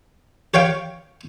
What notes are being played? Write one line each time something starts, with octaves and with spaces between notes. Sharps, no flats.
G4 C#5 F5 G5